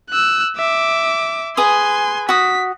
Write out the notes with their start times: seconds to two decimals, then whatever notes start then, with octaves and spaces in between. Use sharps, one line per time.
0.10 E6 F#6
0.56 E5 D6
1.57 G#4 B4 G#5 C6 D#6
2.29 F#4 D#6 B6